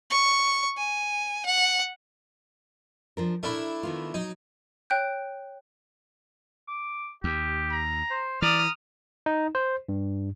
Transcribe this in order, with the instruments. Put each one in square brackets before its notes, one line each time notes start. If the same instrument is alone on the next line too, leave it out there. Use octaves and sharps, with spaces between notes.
[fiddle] C#6
G#5
F#5
[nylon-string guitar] F3 D4 A#4
[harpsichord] A3 D4 E4 [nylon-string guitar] A#4
[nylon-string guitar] D#3 B3 F4
[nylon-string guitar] F#3 [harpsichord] D#4
[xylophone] C#5 G5 F#6 G6
[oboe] D6
[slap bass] D#2 [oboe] G4
[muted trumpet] A#5
[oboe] C5
[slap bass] E3 [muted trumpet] D5 [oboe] A#5 [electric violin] D#6 F6
[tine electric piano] D#4
C5
G2